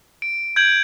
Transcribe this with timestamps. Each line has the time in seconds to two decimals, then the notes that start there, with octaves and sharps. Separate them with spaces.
0.22 D7
0.56 G6 G#6 D7 F#7